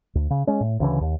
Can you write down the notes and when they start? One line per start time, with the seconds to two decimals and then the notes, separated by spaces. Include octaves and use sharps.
0.15 D2
0.30 C#3
0.47 G#3 C#4
0.61 A2
0.80 D2 C#3 E3
1.01 D#2